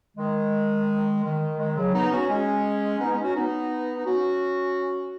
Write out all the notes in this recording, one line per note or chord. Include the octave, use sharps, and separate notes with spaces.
D#3 G#3
D#3
D#3 G#3
C#3 F#3
B3 D#4
C#4 F#4
G#3 C#4
B3 D#4
G#3 C#4
C#4 F#4
B3 D#4
D#4
C#4 F#4